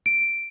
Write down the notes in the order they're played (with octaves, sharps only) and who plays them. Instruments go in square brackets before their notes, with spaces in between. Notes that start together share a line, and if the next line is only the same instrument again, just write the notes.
[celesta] D7